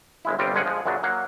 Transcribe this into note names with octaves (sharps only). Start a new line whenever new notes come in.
G1 G#3 E4
G1 G3 C4 F4 G5
G1 F3 G#3 C#4 G#4 F#5
F3 G#3
F#2 A#2 C#3 F#3 D4
F#3 A#3 F5 F#5